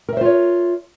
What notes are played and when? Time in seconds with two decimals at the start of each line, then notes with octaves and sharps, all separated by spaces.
0.09 A#4
0.13 E5
0.17 C5
0.21 F4
0.25 C#5